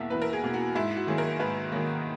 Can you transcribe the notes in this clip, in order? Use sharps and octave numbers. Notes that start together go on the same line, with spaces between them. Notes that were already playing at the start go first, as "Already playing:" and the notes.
Already playing: E2 B2 A#3 E5
E2 B4
A#4
G#4
B2 A#3
F#4
G#2 E4
F#4
D#3 F#3 A#3 G#4
A#4
G#2 B4
D#3 F#3 A#3